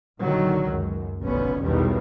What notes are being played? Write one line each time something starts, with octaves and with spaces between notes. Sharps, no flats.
A#1 D3 D#3 F#3
C#2 F#2
F1 B1 D3 B3 C#4
B1 E2 B2 D#3 G3